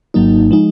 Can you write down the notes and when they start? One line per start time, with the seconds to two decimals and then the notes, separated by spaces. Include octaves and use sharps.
0.14 G#1 G#2 F#3 A#3 D#4
0.51 F3 G#3 D#4